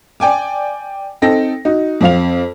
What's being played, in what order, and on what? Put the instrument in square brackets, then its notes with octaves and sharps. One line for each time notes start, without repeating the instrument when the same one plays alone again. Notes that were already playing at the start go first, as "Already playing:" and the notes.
[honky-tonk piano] D5 G5 G#5 D6
C4 D#4 A4 G5 A#6
D#4 F#4
F2 C4 F5 F7